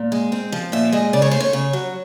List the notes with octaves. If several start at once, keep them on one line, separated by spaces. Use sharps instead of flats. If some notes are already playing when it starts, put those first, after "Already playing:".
Already playing: A#2
G#3
C4
F3
A#2 E5
G#3 D#5
C#3 D5
C#5
A3 C5
C#5
C#3
F#3